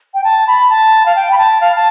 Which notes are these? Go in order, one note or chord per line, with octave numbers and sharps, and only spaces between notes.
G5
A5
B5
A5
F5
G5
B5
A5
F5
A5